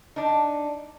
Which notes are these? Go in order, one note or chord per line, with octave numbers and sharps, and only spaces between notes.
D4 D#4